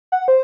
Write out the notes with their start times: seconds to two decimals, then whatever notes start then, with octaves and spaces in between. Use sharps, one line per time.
0.12 F#5
0.28 C5